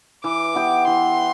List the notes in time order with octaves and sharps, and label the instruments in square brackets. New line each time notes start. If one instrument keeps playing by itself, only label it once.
[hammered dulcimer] E3 [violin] D6
[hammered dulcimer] B3 E4 G4
[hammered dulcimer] E3 [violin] C6